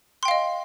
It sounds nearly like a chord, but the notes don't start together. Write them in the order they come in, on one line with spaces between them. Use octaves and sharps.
C6 G5 F5 D#5